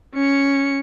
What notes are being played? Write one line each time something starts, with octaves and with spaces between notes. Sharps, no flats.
C#4 C#7